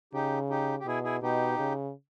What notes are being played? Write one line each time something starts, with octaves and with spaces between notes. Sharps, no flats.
C#3 D#4 G4
D#4 G4
G4
B2 E4 G#4
E4 G#4
B2 D#4 G4
C#3